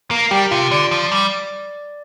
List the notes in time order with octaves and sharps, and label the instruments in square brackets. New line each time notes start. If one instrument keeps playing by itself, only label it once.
[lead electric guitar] A#3 [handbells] A#4 A#5
[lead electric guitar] G3 [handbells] G4 G5
[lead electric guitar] C3 [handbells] F4 F5
[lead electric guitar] D3 [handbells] D5
[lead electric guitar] F3
G3